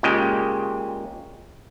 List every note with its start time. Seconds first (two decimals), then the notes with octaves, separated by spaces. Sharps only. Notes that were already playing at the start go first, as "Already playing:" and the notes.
0.03 A#2 C#3 G#3 G4 G5